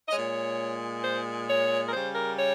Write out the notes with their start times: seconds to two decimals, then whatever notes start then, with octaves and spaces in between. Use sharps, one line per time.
0.07 D#5
0.11 A#2 G#3 C#5
1.02 C5
1.47 C#5
1.87 A#4
1.92 C#3 G3 C5
2.14 A#4
2.38 C#5